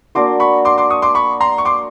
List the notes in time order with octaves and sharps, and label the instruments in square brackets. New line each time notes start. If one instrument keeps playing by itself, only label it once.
[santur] A#3 D4 F#4 A#4 [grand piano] C6 D6
[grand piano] B5 C#6
C6 D6
C6 D6
C#6 D#6
C6 D6
B5 C#6
A#5 C6
C#6
C6 D6